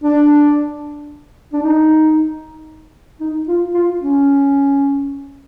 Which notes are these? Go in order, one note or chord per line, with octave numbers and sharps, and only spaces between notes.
D4
D4
D#4
D#4
F4
F4
C#4